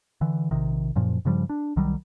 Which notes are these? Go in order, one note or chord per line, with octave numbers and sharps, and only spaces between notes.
D3 E3
A#1 C3 D#3
F#2 A#2 F3
G2 C#3 F3 G3
D4
C2 D#3 F#3 G3